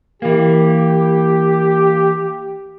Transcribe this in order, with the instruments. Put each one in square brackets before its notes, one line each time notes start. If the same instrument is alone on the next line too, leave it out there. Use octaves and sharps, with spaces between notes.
[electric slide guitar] E3 A#3 [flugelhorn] G4